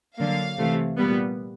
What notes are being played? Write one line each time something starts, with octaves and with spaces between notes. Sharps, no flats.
D3 F#3 A#3 F5
C3 E3 A3
A#2 G3 B3